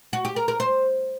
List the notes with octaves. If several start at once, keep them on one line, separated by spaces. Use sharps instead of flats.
F#4
G4
A#4
A#4
C5